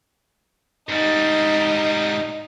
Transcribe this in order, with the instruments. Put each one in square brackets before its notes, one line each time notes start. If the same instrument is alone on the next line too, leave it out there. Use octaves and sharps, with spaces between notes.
[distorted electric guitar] G#2 G3 [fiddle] D#4